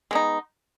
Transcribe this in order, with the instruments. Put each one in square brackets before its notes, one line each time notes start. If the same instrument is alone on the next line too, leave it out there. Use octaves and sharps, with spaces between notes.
[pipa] G#3 B3 D#4